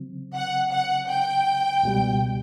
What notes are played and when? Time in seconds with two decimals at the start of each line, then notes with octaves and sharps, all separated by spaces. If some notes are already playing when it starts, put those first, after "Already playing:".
Already playing: C#3 F#3 C4
0.35 F#5
0.72 F#5
1.09 G5
1.83 C#2 B2 G3